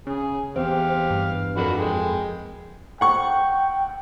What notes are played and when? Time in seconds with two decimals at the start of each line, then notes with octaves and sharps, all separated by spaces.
0.07 C#3 G#4
0.56 E2 C4 G4 F5
1.11 G2
1.57 F2 D4 F#4 A4 A#4 B5
1.78 G#3 G5
3.01 F#5 G5 C#6